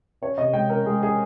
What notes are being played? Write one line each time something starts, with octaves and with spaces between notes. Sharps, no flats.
C#4 C#5
C3 D#5
G#3 G5
C#4 A#4
G#3 G#4
C#4 G#4